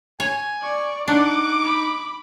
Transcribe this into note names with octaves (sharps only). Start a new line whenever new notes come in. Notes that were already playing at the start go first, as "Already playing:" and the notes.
C#5 G#5
D5 C#6
D4 D#4 F#5 D6
B5